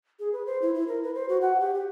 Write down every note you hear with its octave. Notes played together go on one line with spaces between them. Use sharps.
G#4
B4
C5
E4
E4
A#4
B4
C5
F#4
F#5
G4
G4